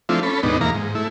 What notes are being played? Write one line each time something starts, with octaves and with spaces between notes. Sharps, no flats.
F3 A3 C4 D4 E4 F4
C#4 A4 B5
D#2 G#2 B2 B3 D4 D#4
E2 E3 A#3 F5 A#5
G#2
A3 E4